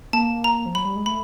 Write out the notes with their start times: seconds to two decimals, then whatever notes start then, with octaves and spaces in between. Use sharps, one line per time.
0.13 A#3 A5
0.44 A#5
0.66 F3
0.75 F#3 B5
0.85 G3
0.96 G#3
1.06 A3 B5